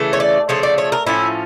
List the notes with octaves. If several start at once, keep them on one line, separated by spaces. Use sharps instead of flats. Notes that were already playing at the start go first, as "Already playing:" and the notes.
Already playing: C#3 E3 A3
C#5
D5
C#3 F3 A3 C#5
D5
C#5
A#4
A2 F3 C#4 E4